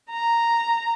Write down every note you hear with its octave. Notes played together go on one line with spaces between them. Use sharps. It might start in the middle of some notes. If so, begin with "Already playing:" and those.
A#5